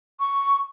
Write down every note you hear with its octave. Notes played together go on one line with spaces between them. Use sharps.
C#6